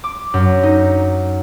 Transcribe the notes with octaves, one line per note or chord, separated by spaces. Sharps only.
D6
F#2
D#4